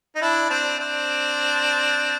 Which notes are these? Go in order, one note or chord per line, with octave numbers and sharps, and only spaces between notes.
D#4
D4 E4
C4 D4
C4 D4